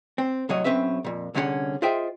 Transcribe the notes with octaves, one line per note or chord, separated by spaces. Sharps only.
C4
C2 A2 F#3 C#5 D#5
B1 G#2 C4 C#4 B4 E5
F2 A#2
C2 D3 C#4 E4 G#4 F#5
F4 G#4 C5 D#5 E5 G5